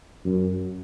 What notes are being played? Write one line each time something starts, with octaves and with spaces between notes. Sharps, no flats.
F#2